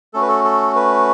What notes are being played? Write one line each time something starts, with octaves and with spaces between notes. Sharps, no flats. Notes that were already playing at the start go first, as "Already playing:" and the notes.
A3 C#4 F#4 A4
B4
A4
A4
B4